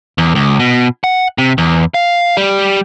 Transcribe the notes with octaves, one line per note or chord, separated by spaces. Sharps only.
E2
C#2
B2
F#5
C3
E2
F5
G3